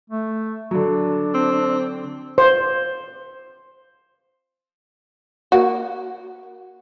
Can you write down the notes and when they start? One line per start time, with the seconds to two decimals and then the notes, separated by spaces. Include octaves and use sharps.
0.10 A3
0.71 D3 F#3 D4
1.34 C4
2.38 C5
5.52 A#3 F#4